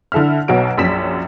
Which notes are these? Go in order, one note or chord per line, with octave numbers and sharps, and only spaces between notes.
D3 E4 A4 E5 F6
B1 B2 F#3 F#4 D7
A#1 F#2 B6 E7